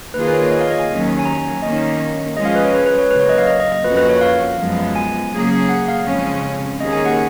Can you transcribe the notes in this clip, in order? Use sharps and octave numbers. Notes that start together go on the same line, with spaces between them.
D#3 A#3 F4 G#4 B4
B4
C#5
C#5
D#5
F5
D#5
G#5
D#2 D#3 F#3 C#4
G#5
A#5
G#5
D#3 A#3 C#4 D#5
F3 G#3 C#4 G#4 D#5
F5
B4
C#5
B4
B4
C#5
C#3 F#3 A#3 B4
C#5
D#5
F5
D#5
D#5
D#5
F2 F3 A#3 C#4 F#4 B4
B4
C#5
F5
F#2 F3 G#3 B3
G#5
C#3 F#3 A#3 C#4 G#4
F#5
F5
F2 C#3 G#3 C#4
D#2 D#3 A#3 C#4 G#4 D#5
G#5
F#5